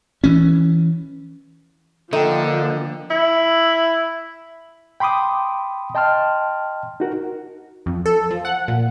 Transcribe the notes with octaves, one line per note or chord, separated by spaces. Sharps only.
E3 C#4
D3 F3 A#3 D#4 A4 D#5 G5
E4
G5 B5 C6 D6 D#6
D#5 G5 A5 C6 F6
D#4 F#4 A#4
F2
A4
F3
F#5
A#2